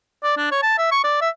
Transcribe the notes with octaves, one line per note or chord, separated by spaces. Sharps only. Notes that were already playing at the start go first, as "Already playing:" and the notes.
D5
D4
C#5
A5
E5
C#6
D5
E5